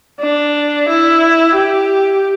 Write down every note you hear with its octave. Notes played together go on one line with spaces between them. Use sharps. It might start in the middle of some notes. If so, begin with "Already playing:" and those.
D4
E4
G4